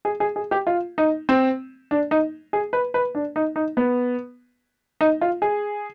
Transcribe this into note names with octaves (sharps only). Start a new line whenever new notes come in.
G#4
G#4
G#4
G4
F4
D#4
C4
D4
D#4
G#4
B4
B4
D4
D#4
D#4
B3
D#4
F4
G#4